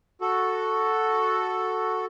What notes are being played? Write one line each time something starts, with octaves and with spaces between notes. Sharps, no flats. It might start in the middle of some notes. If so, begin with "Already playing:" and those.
F#4 A4